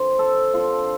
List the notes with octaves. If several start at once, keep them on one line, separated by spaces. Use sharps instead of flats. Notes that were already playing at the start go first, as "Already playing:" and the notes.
Already playing: D3 F3 C4 C5
A4
D3 F3 C4 F4